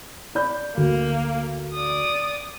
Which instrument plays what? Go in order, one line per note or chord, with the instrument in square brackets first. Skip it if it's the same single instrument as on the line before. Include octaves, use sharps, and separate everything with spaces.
[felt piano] D5 B5 G6
[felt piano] D2 [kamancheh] A#3
[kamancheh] D5 D#6